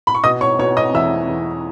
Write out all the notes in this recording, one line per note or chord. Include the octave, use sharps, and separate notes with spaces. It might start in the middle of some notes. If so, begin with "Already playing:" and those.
B5
C#6
B2 D#5 D#6
C#5 C#6
B2 C#5 C#6
D#5 D#6
E2 E5 E6
E2